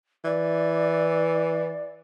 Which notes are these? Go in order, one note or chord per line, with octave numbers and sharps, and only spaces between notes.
E3 D5